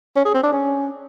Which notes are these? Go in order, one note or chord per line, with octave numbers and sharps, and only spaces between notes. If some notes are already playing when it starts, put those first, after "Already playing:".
C#4
G#4
C4
D4
C#4